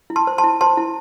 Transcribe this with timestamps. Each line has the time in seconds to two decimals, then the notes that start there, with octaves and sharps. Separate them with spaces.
0.10 E4
0.16 A5 C6
0.27 C5
0.38 A5 C6
0.44 E4
0.61 C5 A5 C6
0.77 E4